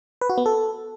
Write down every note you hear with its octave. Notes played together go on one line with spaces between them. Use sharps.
B4
F#4
B3
A4